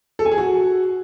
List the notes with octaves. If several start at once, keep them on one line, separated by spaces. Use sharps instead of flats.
A4
G#5
G#4
F#4